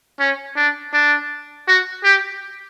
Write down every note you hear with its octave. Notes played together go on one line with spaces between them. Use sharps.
C#4
D4
D4
F#4
G4